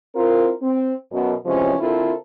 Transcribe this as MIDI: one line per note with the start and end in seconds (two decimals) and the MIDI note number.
0.15 0.51 60
0.15 0.51 64
0.15 0.51 65
0.15 0.51 70
0.62 0.93 60
1.12 1.34 42
1.12 1.34 47
1.46 1.75 48
1.46 1.75 52
1.46 1.75 53
1.46 1.75 56
1.46 1.75 61
1.80 2.14 50
1.80 2.14 60
1.80 2.14 64
1.80 2.14 65
1.80 2.14 69
1.80 2.14 70